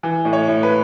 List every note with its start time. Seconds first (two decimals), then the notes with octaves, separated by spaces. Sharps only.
0.03 E3
0.25 A2
0.33 C#5
0.48 A2
0.63 B4